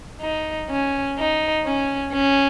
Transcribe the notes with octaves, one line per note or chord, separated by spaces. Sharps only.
D#4
C#4
D#4
C#4
C#4